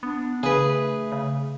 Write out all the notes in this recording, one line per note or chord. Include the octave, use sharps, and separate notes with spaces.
B3 D4
C#3 A3 G#4 B4
C#3